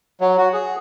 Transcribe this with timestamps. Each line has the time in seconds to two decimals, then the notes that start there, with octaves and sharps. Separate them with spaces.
0.21 F#3
0.38 F#4
0.53 G#4